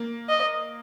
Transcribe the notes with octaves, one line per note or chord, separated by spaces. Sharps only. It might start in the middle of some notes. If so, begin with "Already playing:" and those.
Already playing: A#3
D#5